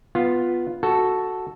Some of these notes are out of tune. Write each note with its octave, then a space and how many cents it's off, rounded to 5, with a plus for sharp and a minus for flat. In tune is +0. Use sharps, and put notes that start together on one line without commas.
B3 +0 F4 +0
F#4 +0 A4 +0